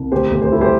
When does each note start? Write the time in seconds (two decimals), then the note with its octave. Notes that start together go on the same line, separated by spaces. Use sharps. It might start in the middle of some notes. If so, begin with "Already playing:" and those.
Already playing: C2
0.11 D2 G4 C5
0.31 D2
0.42 C5
0.51 G3 E4 A4
0.61 G4 C5